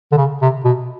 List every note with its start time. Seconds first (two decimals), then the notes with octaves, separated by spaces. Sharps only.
0.12 D3
0.17 C#3
0.41 C3
0.64 B2